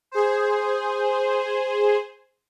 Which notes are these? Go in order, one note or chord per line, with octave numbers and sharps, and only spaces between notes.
G#4 C5